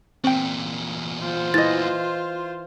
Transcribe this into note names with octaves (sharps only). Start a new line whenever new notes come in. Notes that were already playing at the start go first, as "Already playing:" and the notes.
E2 A#2 C4 G5
F4 C5
E3 D#5 A6